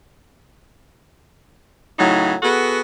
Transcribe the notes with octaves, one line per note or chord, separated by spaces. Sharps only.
A2 C#3 F#3 D#4
B3 F#4 G#4 A4